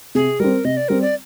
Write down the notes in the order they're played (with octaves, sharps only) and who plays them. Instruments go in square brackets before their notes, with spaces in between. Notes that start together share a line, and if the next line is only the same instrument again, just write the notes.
[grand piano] C3 [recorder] G#4
[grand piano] G3 C4 [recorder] A#4
[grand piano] C3 [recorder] D#5
[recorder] D5
[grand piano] G3 C4 [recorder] A#4
[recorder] D5